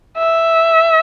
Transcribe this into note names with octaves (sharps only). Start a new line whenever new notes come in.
E5